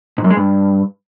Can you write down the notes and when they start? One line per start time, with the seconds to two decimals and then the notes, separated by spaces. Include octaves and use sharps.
0.18 G#2
0.24 F#2
0.30 G#3
0.37 G2